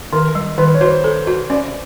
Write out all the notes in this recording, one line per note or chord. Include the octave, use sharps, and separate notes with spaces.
D#3 A#4
G3
D#3 B4
C#5
F#4 C5
A4
F#4
C#4 D5